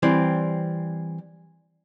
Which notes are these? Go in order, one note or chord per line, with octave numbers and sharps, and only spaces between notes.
E3 G3 C4